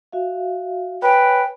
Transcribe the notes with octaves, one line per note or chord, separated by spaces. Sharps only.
F#4 E5 F5
B4 C#5 G5 G#5